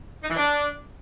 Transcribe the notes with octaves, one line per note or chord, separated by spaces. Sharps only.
D#4
E3
D4